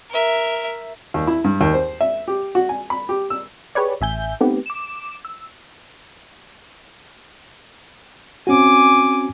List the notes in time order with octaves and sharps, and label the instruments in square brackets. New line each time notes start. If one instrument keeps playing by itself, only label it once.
[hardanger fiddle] A#4 E5
[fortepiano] D#2
E4
G2
D#2
C5
E5
G4
F#4
G#5
B5
G4
E6
[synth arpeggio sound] G4 G#4 B4 C#5 D5
A1 E5 G#5 G6
A3 B3 C4 D#4 G4
D6 E7
E6
[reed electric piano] C4 C#4 F#4 [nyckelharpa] G#5 D6